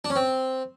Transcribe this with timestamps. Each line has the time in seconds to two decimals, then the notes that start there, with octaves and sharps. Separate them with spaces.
0.05 D4
0.10 C#4
0.16 C4